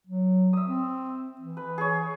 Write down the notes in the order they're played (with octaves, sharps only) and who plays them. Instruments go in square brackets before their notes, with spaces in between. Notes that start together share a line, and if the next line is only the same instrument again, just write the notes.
[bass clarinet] F#3
[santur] E5 D#6
[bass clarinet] C4
E3
[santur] B4
G#4 C#5